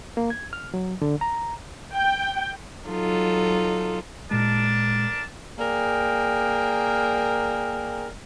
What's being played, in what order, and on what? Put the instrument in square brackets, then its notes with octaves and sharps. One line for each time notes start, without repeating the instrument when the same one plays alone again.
[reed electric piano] A#3
G#6
F6
F#3
D3
A#5
[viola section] G5
[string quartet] F#3 D#4 F4 A4
[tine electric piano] A#2 G#3 [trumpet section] D4 A#4 A5
[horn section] A#3 G#4 A#4 D5 G5